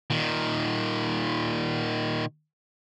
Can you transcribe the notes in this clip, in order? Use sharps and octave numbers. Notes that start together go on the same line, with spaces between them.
A#2 D#3